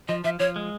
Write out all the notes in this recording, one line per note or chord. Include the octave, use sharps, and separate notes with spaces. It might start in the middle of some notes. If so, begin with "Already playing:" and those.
F3 D#5
F3 E5
F3 C#5
G#3